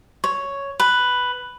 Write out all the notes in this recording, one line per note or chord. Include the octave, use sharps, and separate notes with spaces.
C#5
B4